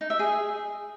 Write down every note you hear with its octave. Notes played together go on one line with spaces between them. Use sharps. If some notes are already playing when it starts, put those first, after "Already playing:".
D#4
E5
G#4